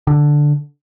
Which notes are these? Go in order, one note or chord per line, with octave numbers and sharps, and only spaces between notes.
D3